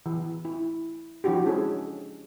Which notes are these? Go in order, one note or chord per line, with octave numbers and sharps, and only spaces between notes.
E3
E4
F3 D4 E4 F#4 G4
G#3 C#4 G#4 A4